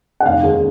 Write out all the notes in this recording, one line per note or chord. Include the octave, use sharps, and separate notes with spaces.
F#5
F1 F5
D#2 D#3 G#3 C#4